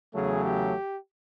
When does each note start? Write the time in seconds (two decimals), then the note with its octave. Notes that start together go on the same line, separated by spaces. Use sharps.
0.14 E2 C#3 F#3 A3 G#4
0.43 G4